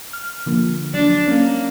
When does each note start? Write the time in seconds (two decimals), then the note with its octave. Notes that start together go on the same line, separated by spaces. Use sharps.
0.13 F6
0.46 D3 F3 A#3
0.94 F#3 D4
1.27 A#3 C#4